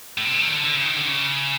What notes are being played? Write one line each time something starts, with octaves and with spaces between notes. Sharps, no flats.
A2
C3
D3
D#3
D3
D3
C#3
D#3
D3
C#3